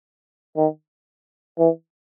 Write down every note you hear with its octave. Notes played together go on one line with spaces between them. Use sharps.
D#3
E3